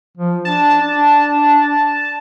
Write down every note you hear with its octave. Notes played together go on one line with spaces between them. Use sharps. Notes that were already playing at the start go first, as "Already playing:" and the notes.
F3
D4 A5
D4